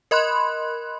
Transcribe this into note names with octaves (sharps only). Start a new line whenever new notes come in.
A#4 D#5 B5 C6 F#6